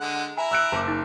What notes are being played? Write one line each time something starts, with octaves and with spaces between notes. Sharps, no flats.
D3 G#3 F#5
E4 E5 G#5 A#5
E6 F#6 D7
F#1 A5 D6
D#4